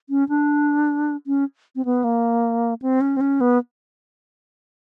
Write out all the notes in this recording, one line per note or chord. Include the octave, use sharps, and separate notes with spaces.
C#4
D4
C#4
C4
B3
A#3
C4
C#4
C4
C#4
B3